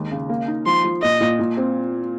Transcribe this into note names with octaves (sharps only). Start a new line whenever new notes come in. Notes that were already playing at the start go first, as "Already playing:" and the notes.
Already playing: D#2 G#3
C#3
A#3
D#4
F3 C6
F3
A#2 D#5
A#2
A#2
C4